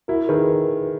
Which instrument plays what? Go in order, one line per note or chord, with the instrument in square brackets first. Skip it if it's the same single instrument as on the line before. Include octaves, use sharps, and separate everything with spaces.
[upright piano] E4 [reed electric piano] F#4 A#4
[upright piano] D#3 [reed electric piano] G#4 B4